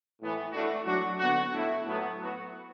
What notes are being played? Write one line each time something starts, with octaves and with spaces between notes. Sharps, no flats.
A2 E3 B3
A2 A3 D4 F#4
F#3 D4 F#4
D3 B3 D4 F#4
A2 A3 E4
A2 F#3 B3
F#3 B3 F#4